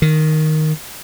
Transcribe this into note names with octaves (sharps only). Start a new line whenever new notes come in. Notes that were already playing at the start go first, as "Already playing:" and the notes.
D#3